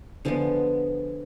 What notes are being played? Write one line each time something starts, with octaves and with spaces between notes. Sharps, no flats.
D3 F3 G#3 B3